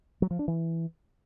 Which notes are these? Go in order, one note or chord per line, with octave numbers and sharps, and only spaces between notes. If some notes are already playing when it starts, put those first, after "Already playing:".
F#3
F3
D4
E3